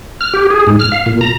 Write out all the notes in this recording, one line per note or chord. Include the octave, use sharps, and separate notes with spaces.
F6
G4
G#4
G#2
F6
F5
A#2
A#5